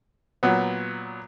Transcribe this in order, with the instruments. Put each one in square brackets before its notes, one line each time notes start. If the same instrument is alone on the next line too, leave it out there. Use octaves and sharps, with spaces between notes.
[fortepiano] A#2 F#3 B3